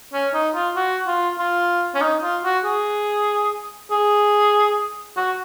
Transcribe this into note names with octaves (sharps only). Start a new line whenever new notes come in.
C#4
D#4
F4
F#4
F4
F4
C#4
D#4
F4
F#4
G#4
G#4
F#4